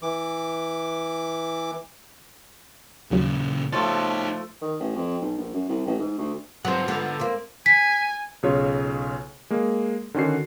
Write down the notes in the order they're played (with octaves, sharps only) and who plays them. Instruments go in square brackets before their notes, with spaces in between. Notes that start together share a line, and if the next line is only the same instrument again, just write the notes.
[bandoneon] E3 D6
[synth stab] D#2 F#3 [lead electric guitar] A#2 C#3
[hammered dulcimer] F3 A3 [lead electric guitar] D#4 C#5 [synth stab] A6
[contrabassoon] D#3
A1
F2
B1
A#1
F#2
C2
A1
G#2
D2
[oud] F#3 C4 [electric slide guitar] F4 B4 F#5
[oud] D3 B3
A#3 C4
[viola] G#5 [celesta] B6
[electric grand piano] B1 C#3 F4 C#5
G#3 A#3
D3 D#3 C#4 F#4 C7